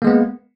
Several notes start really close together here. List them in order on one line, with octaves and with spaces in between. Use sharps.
A#3 G#3 B3